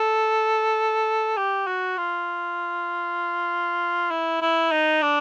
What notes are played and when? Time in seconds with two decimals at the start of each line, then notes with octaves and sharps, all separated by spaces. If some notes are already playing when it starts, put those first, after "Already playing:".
Already playing: A4
1.37 G4
1.67 F#4
1.98 F4
4.11 E4
4.42 E4
4.72 D#4
5.02 D4